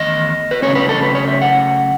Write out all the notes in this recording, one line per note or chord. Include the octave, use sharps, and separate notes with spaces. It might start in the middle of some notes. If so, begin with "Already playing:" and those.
Already playing: E2 D#3 A3 C#4 D#5
B4
C#3 F#3 A3 C#4 C#5
B4
A4
B4
C#5
E5
F#5